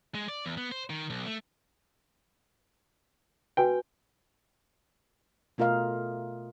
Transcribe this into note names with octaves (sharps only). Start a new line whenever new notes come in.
G#3
D5
E2
B3
C5
D#3
B1
A3
F#4 B4 G5 G#5
B2 A3 F4 A#4 D#5 F5